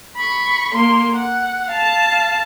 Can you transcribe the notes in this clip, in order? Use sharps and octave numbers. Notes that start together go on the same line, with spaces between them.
B5 C#6
A#3 C6
F#5
F5 A5